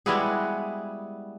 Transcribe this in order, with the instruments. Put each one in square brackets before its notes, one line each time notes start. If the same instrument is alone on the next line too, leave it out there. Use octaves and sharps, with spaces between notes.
[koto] G3 G#3 B3 E4 F#4 G#4